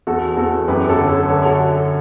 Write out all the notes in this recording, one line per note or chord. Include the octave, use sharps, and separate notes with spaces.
E2 F#4 A4
E2 F#4 A4
F#2 G4 B4
A4 C#5
D3
A4 C#5
D3 A4 C#5
F#4 A4